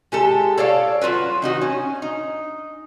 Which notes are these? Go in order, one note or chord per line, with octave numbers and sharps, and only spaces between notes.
G#3 G4 A4
A4 C#5 D5 F5
F#3 F4 F#4 B4
D#3 D#4 F#4
C#4
D#4